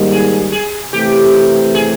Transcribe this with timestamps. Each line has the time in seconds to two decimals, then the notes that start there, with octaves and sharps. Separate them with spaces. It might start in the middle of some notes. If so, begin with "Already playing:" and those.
Already playing: G#2 D#3 G3 A#3 D#4
0.12 G#4
0.52 G#4
0.92 C3 E3 A3 G4
1.75 G#4